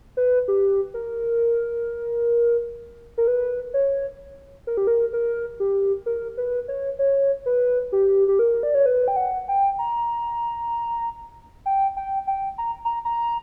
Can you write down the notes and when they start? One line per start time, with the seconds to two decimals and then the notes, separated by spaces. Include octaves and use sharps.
0.17 B4
0.48 G4
0.94 A#4
3.18 A#4
3.27 B4
3.74 C#5
4.67 A#4
4.77 G4
4.87 A#4
5.13 A#4
5.60 G4
6.06 A#4
6.37 B4
6.68 C#5
6.99 C#5
7.46 B4
7.92 G4
8.28 G4
8.39 A#4
8.63 D5
8.74 C#5
8.86 B4
9.08 G5
9.16 F#5
9.48 G5
9.79 A#5
11.66 G5
11.97 G5
12.27 G5
12.58 A#5
12.85 A#5
13.05 A#5